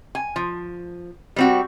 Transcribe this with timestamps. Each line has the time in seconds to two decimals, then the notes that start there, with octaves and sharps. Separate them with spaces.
0.15 G#5
0.36 F3
1.36 G3 C4 F#4